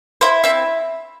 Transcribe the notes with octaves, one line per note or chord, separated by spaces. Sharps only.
E4 C5
C4 E5